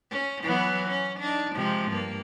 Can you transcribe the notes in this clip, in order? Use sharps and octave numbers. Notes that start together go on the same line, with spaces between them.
C#4
E3 F#3 B3
C#4
D4 D#4
C3 F3 G#3
G2 A#3